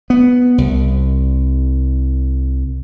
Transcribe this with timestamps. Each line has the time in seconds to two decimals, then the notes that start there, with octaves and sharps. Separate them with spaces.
0.10 B3
0.58 C2